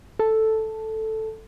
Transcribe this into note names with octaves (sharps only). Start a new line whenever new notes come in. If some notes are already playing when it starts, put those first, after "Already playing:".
A4